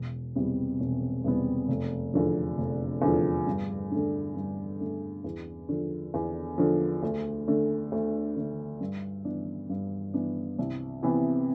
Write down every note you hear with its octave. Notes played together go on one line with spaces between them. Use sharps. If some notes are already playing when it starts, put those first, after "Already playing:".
Already playing: E1
E2 C3 G3 B3
E1
E2 C3 G3 B3
F1
E2 D3 F3
F1
E2 D3 F3
G2
D3 A3 D4
G2
D3 A3 D4
E2
D3 F3
E2
D3 F3
D2
D3 A3
D2
D3 A3
G2
E3 B3 D4
G2
E3 B3 D4
C2
C3 E3 B3 E4